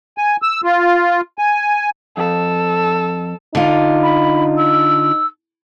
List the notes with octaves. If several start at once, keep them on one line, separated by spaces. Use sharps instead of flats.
G#5
E6
F4
G#5
F2 A4
D3 D#4 F4
B5
E6